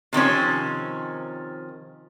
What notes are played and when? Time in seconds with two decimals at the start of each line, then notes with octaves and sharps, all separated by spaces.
0.13 C3 D#3 F3 C#4